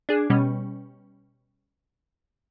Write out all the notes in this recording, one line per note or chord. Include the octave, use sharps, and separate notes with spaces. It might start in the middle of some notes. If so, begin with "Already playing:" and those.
D4 G#4
B2 G3 C#4